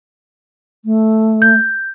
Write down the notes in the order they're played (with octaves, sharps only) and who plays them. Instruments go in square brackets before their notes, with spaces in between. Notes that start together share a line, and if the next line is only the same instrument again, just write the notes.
[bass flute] A3
[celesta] G6